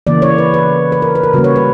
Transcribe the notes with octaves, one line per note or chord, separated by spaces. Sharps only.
C#3 E3 A#3 D5
C#5
B4
B4
B4
A#4
B4
A#4
C#3 G3 A#3 F#4
C#5
B4